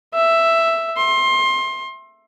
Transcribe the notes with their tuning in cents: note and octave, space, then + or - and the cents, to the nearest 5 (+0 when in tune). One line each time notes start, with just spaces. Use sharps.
E5 +5
C6 +25